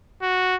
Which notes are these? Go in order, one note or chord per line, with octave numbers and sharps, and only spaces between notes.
F#4